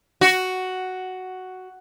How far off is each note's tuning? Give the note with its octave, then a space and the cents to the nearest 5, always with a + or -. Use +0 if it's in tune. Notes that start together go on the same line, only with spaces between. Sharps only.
F#4 +5